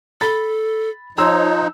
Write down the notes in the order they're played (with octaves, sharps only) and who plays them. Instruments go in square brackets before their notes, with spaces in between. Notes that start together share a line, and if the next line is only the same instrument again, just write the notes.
[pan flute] A4 [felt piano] B5 A6
[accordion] F3 D#4 [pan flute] C#5 [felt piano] A#5 C6 E6